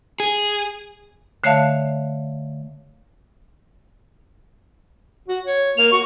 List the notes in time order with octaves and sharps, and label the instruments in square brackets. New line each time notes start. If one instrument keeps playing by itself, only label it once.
[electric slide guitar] G#4
[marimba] D3 A3 C#5 E5 F5 A5
[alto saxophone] F#4
C#5
[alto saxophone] A#3 [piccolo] F7
[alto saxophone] F#4 [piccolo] C#6